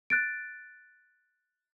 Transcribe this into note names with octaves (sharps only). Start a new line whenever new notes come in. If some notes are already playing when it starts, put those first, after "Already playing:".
F#6 A6 D7